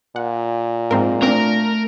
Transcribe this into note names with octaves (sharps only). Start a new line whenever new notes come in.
A#2 F#5
G#2 F3 C4 A#4
A3 C4 D4 A#4